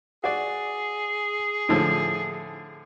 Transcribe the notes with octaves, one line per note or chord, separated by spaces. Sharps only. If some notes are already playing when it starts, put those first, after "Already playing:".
F#4 G#4 D5
A2 D3 F3